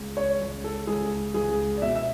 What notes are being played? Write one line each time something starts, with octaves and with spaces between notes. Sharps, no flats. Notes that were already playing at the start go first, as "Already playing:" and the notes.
Already playing: C#2
C#5
C#2
A4
C#2 G#4
C#2 G#4
D5
B2 E5
E5